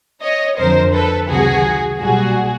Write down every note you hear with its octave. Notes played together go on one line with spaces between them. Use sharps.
C#5 D#5
F2 D3 F3 A#4 C5
A4 B4
C#2 C3 D#3 F#3 F#4 G#4
B1 A#2 G3 F#4 G#4